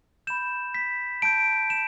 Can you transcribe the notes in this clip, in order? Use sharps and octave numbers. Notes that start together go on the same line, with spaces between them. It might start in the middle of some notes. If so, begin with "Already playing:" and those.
B5 G6 E7
B6
A5 G6 D7
E7